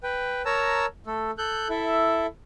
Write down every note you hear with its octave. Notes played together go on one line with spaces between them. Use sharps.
B4 G5
A#4 C#5 A5 A#5 E6
A3 A4
A4 F#6 G6
E4 A4 E5